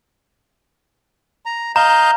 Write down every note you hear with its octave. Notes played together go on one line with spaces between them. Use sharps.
A#5
D#5 F5 A#5 G6